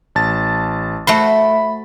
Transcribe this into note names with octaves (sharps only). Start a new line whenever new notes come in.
A1 A5 A6
A3 F#4 C5 B5